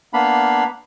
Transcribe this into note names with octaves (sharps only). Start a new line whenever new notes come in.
A#3 B3 D4 F5 B5